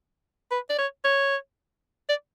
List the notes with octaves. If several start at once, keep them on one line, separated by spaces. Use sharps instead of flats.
B4
D5
C#5
C#5
D5